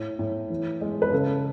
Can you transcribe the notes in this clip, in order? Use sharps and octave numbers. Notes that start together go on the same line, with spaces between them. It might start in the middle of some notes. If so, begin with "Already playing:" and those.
Already playing: A2
A2
E3
G#3
B4
C#3 A4